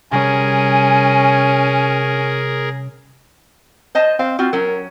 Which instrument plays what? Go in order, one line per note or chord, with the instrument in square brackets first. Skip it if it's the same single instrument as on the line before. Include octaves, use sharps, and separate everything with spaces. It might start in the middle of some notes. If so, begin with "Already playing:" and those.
[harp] C3 G3 [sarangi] C#4 [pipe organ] G#4 A#4 [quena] G#5
[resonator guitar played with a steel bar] C5 D#5 A5
[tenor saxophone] C4 [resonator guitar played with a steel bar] F5
[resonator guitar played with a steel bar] C4 F4 [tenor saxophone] F#4
[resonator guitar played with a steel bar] F#3 C#4 [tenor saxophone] A#4